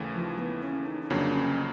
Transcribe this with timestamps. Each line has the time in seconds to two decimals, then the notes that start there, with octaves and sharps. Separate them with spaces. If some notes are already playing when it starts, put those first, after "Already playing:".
Already playing: D#2 C#3 E3 A3
0.14 F3
0.38 B3
0.63 C#4
0.86 D#4
1.02 D#4
1.10 G1 F2 C#3 F#3 A#3 D4
1.34 C#4